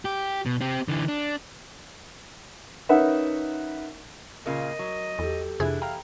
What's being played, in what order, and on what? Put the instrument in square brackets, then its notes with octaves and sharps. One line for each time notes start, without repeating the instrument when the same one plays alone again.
[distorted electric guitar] G4
B2
C4 G4
D3 E3
D4
[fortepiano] C#4 D#4 A#4 B4 E5 F#5
[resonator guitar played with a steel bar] A#2 C#3 F4 [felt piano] A#4 [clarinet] D#5
[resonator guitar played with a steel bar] F#3
[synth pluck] E2 [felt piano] G4 A4
[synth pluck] F2 C3 G#4 [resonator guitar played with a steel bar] E3 E4 [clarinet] D4
[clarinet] F5 [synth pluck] G5 A#5